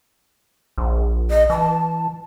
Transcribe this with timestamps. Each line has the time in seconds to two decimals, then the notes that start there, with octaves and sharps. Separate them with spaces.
0.78 A#1
1.30 D#5
1.50 E3 A5